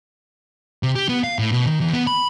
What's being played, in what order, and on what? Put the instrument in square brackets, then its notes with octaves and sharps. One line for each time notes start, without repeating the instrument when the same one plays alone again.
[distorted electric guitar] C3
G4
B3
F5
A2
B2
D#3
E2
B3
B5